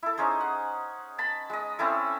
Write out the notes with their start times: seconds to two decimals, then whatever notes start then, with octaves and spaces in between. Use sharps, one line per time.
0.03 E4 A4
0.17 C#4 D#4 G#4 C5
0.40 F#5
1.18 A5 B5
1.50 G#3 D#5
1.79 C4 C#4 E4 A4